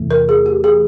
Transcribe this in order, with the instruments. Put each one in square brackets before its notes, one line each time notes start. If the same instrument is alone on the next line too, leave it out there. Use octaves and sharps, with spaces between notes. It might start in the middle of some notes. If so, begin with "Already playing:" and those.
Already playing: [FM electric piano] E2 C3 E3 A3
[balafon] A#4
G#4
G4
G#4